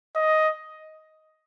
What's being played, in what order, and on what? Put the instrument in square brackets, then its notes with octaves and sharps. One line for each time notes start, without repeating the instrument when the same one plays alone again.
[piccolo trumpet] D#5